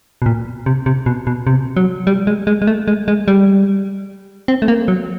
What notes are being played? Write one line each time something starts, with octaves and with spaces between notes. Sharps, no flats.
B2
A#2
C3
C3
B2
B2
C3
F#3
G3
G#3
G#3
G#3
A3
G#3
G#3
G3
C4
A3
A#3
F#3